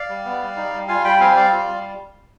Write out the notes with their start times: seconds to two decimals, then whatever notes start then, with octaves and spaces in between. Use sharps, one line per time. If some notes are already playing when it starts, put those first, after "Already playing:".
Already playing: D5 F5
0.09 G3
0.25 B3
0.41 G3
0.57 D#4
0.73 G3
0.88 F4 F5 G#5
1.04 G3 G5 B5
1.20 C4 F5 G#5
1.36 G3 D5 F5
1.52 F4
1.68 G3